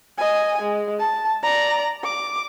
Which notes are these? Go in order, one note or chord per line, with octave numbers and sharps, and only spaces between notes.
D#5 G#5
G#3
A5
D5 A#5
D6